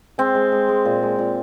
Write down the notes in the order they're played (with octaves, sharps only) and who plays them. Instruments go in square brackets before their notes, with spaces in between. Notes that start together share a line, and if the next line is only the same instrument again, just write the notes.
[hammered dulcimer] G#3 C4
G#3
G#3
G#3
A#2
G#3
A#2